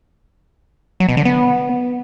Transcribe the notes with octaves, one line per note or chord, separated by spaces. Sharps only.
F#3
B2
D3
B3